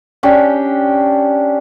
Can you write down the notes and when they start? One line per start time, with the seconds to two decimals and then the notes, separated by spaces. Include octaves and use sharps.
0.23 C#4 D4 G4 G5